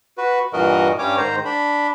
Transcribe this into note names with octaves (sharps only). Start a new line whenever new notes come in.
F#4 B4
G2 A#2 E3 F#4 A#4 D#5
G2 G3 C#4 C#5 D6
G#2 D#3 C5 A#5
D4 B5